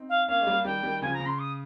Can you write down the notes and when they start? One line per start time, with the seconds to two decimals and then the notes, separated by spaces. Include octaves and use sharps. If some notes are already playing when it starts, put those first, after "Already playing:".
Already playing: C4 D#4
0.09 F5
0.28 A#3 C#4 F5
0.41 G#3
0.46 G3 A#3
0.65 D#3 G3 G5
0.83 D#3 G3
1.02 C#3 F3 G#5
1.14 A#5
1.20 C#3
1.26 C6
1.39 D#6